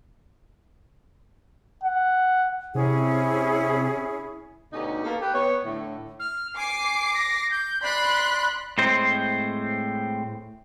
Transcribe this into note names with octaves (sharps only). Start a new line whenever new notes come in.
F#5
C3 C#4 E4 G#4
D2 B2 D3 C#4 D#4 G4
A#3 B3 A4
G4 B4
B3 C#5
A2 D3
F6
G#5 D6 C7
A#6
G6
D5 B5 C6 F#6
A2 G#3 C4 C5